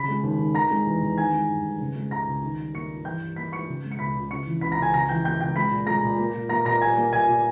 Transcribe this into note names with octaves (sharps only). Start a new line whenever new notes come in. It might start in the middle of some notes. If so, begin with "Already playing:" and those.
Already playing: C#3 B5 B6
G#3
D#2
D#2
D#3 A#5 A#6
G#3
E2
E2
D#3 G#5 G#6
G#3
G2
G2
C#3
G#3
C#2 A#5 A#6
C#2
D#3
G3
A#3 C#6 C#7
G2
E3 G5 G6
G3
A#3 B5 B6
G#2 C#6 C#7
C#3
G#3
C#7
C#2 B5 B6
C#2
C#3 C#6 C#7
E3
C#2 B5 B6
A#5 A#6
C#2
G#5 G#6
C#3 A#5 A#6
E3 G5 G6
A#3 G5 G6
C#2 G5 G6
G#3 B5 B6
A#2
G#3 A#5 A#6
A#2
A#3
A#2
A#3 A#5 A#6
A#2 A#5 A#6
G3 G#5 G#6
A#3
A#2 G#5 G#6
A#2